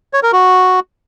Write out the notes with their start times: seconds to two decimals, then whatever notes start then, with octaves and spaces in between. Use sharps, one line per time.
0.13 C#5
0.23 A#4
0.33 F#4